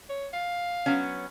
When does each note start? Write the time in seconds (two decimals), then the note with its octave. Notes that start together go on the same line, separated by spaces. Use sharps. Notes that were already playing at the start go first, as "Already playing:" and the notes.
0.09 C#5
0.33 F5
0.86 F#3 B3 C#4